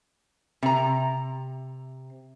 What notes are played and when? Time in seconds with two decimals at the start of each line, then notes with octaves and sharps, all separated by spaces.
0.63 C3 A#5